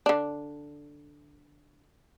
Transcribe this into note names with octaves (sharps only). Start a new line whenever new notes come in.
D3 D4